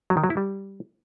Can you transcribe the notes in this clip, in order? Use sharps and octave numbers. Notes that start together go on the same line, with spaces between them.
F#3
D#3
F#3
E4
G3